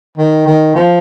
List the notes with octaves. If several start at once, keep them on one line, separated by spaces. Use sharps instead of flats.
D#3
D#3
F3